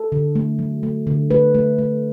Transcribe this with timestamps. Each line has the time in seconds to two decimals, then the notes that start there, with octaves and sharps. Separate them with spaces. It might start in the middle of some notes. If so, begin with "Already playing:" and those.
Already playing: A4
0.12 D3
0.35 A3
0.59 F#3
0.83 A3
1.07 D3
1.30 A3 B4
1.54 A3
1.78 A3